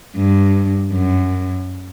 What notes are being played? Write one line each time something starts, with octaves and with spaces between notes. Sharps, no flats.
G2
F#2